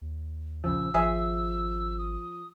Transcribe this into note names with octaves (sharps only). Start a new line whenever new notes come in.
D#2
A#1 C#3 F3 E6
G#1 F3 G#4 E5
D#6